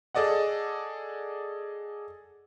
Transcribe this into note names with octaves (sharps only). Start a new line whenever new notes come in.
G#4 A4 D5 D#5 F#5